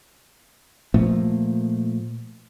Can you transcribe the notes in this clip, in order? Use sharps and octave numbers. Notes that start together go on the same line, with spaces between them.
A#2 F3 A3 A#3